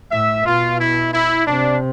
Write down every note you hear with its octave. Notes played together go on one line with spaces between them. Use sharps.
A2 E5
B2 F4
E4
E4
C3 D4